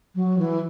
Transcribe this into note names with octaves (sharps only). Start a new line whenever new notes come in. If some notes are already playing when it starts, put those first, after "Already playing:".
F#3
E3